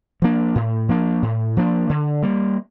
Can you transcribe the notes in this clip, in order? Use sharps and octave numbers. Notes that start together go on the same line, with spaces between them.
F3 A#3 D4
A2
F3 A#3 D4
A2
F3 A#3 D4
D3
G3 A#3